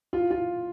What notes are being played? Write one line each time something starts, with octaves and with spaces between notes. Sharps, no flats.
F4
F4